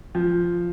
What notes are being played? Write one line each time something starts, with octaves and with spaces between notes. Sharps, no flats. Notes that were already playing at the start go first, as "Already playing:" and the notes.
F3